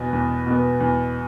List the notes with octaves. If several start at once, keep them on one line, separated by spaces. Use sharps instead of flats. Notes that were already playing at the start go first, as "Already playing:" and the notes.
Already playing: E2 B2 B3 B4
E2
B2 B3
E2